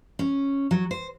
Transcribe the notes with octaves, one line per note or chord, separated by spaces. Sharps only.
C#4
F#3
C5